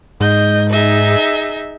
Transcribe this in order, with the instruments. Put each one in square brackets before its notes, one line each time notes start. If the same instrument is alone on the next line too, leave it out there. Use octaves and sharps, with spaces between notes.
[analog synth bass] G#2 [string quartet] D#5 G6
[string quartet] D#4 G#4 E5